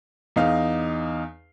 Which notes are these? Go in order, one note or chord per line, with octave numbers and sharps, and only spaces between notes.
E2 D#4 F5